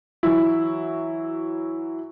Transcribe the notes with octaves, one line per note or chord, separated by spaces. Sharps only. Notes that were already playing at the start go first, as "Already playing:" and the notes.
E3 F#3 E4